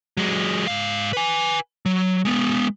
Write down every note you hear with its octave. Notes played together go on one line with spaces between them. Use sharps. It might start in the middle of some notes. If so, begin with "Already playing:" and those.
F#3 G#3
G#2 F5
B4 G#5
F#3
G#3 B3